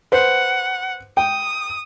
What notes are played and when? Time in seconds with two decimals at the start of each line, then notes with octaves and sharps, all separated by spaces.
0.12 B4 C5 F#5
1.17 G5 D#6